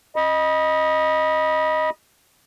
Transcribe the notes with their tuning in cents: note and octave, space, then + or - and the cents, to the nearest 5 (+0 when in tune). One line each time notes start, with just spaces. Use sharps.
D#5 +0 B5 -25